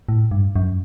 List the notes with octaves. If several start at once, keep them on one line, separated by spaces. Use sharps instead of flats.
A2
G2
F#2